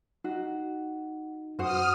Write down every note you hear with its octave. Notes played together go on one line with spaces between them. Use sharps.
D#4 F#4
F#2 F#4 C5 F#5 D#6 F6